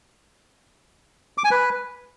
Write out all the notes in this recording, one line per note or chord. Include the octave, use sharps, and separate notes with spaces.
D6
G#5
B4